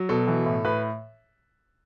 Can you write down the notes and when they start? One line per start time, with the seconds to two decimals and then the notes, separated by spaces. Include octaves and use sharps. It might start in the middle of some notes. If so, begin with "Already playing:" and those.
Already playing: F#3
0.09 B2 A4
0.27 E3
0.46 A2
0.65 A2 B4